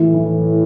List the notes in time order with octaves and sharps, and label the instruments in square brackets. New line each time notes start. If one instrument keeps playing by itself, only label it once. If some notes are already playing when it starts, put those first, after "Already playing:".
Already playing: [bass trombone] A2 [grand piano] E3
[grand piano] E3